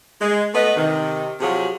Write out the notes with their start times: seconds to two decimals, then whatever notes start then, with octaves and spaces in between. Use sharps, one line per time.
0.21 G#3
0.54 A3 B3 B4 D#5
0.76 C3 D#3
1.40 C3 F3 F#3 G4 G#4